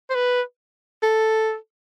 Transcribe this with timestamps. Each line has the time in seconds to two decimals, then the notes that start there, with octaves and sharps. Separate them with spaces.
0.10 C5
0.15 B4
1.03 A4